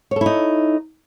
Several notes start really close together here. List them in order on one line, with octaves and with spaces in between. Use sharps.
C#5 A4 E4 D#4